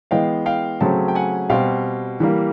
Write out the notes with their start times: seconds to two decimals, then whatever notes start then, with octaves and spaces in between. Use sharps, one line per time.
0.11 E3 G#3 B3 F5 G5
0.46 F5 G5
0.81 C#3 F#3 A3 C4 G5 A5
1.08 G5
1.15 F#5 G#5
1.50 B2 G3 C4 F5 G5
2.20 E3 G3 A#3